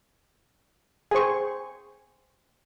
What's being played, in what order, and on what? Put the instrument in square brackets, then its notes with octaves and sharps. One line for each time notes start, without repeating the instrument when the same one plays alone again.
[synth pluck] G#4 C#6 [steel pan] C5 G#5